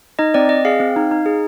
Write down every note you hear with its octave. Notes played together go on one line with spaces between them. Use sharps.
D#4 D#5
C4 D5
C4 D#5
G#4 F5
C4
D#4
D#4
G#4